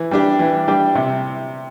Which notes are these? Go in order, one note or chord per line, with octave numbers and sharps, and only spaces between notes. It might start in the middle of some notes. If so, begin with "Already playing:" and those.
Already playing: E3
G3 D4 G4
E3
G3 D4 G4
C3